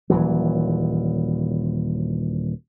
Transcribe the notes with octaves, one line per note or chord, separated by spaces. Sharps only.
D#1 E3 F#3